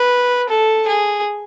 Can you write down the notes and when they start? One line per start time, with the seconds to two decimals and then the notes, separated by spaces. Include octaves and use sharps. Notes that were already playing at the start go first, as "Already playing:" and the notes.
Already playing: B4
0.49 A4
0.88 G#4